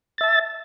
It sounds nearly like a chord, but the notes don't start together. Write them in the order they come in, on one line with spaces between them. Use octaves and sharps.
A6 E5 A5